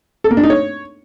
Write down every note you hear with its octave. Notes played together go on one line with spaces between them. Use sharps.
A4
A#3
D4
D#4
C#5